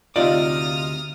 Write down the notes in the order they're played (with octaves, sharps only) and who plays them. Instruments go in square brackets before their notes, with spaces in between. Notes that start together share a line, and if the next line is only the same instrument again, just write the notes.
[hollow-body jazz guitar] D2 C3 D5 [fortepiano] D#4 E5 [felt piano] F4 [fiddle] D#6 F6